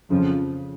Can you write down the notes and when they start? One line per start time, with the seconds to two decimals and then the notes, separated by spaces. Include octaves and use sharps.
0.11 F2 C#3 F3